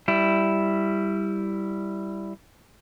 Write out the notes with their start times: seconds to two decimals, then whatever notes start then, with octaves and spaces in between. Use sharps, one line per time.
0.08 G3 E4